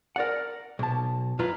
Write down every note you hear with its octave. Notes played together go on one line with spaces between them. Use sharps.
A#4 D5 F#5
B1 A5
F#2 F#3 F4 B4 A#5